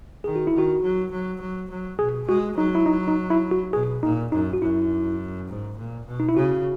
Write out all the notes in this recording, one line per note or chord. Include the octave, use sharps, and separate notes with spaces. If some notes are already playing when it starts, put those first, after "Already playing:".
D#3 G#4
F#4
E4
D#3 F#4
F#3
F#3
F#3
F#3
B2 G#4
G#3 F#4
F#3 D#4
E4
D#4
D#4
E4
F#4
B2 G#4
A#2 D#4
F#2 D#4
F#4
F#2 E4
G#2
A#2
B2
D#4
E4
C#3 F#4